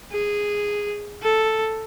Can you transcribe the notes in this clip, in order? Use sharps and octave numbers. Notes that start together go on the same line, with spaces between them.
G#4
A4